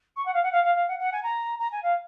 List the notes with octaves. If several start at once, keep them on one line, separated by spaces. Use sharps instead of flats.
C#6
F#5
F5
F#5
F5
F5
F5
F#5
F#5
G#5
A#5
A#5
G#5
F5